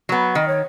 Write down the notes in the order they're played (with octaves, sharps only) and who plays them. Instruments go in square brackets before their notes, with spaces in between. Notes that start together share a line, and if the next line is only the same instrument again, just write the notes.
[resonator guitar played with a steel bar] F#3 B3
[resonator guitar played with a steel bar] D#3 [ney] D#5
[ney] C#5